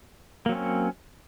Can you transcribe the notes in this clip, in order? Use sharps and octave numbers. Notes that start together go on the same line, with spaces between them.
F#3 A#3 C4 C#4